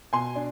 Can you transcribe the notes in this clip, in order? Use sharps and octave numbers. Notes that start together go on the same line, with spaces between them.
B2 G#5 C6
D4